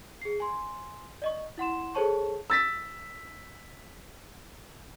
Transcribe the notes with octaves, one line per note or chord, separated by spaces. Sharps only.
G#4 C7
G#5 C6
D5 D#5 C#6
E4 F#5 C6 E7
G#4 A4 C5 C#5 A5 C#6
E6 A6 B6